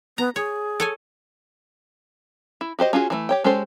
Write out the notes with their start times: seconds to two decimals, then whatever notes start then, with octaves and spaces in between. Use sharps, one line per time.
0.18 B3 A#5
0.36 G#4 C#5
0.80 A4 C#5 G#5
2.61 E4
2.79 F#4 G4 C5 D#5
2.93 C#4 F4 F#4 G#4
3.10 E3 G3 A3
3.29 G4 C#5 G5
3.44 G#3 C#4 G4 A4 C5